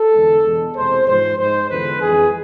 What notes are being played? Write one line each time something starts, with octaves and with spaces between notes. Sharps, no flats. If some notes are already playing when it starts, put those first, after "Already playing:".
Already playing: A4
E2 D3 G#3
E2 B2 G#3
E2 C3 G#3 C5
G#2 F3 G#3 C5
G#2 G#3 C5
E2 D3 F3 G#3 B4
F2 E3 G#3 G#4